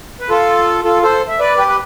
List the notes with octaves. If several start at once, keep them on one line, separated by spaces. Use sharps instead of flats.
B4
F4 A4
F4 A4
A4 C5
E5
B4 D5
G4 B4
B4